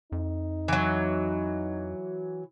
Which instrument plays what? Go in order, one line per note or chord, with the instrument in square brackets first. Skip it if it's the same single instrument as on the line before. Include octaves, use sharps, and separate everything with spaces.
[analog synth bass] F2 [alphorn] D#4
[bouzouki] E3 F#3